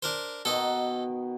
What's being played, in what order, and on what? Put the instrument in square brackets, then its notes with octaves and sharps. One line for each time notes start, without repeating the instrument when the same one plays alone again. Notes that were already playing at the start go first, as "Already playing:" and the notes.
[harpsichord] D4 A#4 C5
[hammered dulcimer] B2 D#3 [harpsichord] A4 D#5